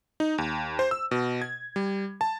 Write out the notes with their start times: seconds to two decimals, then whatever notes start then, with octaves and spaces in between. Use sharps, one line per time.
0.20 D#4
0.38 D#2
0.79 C5
0.91 E6
1.11 B2
1.42 G#6
1.76 G3
2.21 A5